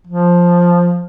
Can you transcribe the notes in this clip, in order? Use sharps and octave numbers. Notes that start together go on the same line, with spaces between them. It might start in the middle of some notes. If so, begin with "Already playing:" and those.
F3